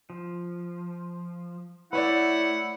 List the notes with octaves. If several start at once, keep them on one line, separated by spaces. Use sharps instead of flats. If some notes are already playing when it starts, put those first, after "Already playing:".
F3
A3 E4 B4 C#5 D5 F#5